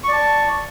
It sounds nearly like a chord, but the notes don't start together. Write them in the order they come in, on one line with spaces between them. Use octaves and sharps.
C#6 D5 A5